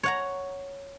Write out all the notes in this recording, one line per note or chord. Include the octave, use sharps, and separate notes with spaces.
C#5 F#5 A#5